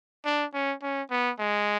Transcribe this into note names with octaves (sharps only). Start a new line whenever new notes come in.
D4
C#4
C#4
B3
G#3